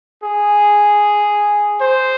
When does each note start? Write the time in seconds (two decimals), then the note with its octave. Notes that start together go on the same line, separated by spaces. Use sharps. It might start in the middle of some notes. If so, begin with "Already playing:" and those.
0.23 G#4
1.81 C5